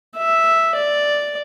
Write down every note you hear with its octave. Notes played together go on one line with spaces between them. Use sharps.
E5
D5